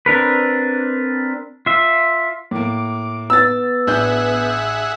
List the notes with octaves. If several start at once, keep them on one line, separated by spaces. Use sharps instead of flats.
C4 D4 A#4 B4
F4 E5
A2 A#3 D6
B3 E6 A6
A1 D4 G#4 E5 F#5 G6